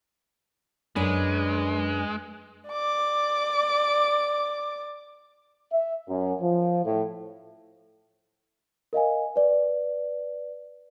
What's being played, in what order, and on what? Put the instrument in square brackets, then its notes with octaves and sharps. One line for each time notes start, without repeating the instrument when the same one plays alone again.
[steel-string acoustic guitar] F#2 D4 B4 [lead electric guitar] G#3
[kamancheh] D5 D6
[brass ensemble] E5
F#2
F3
A2
[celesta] A#4 D#5 F5 G#5
B4 D5